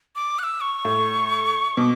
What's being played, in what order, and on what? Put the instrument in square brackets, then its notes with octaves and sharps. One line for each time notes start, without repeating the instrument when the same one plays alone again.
[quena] D6
F#6
E6
C#6
[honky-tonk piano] A2
[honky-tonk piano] B2 [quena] D6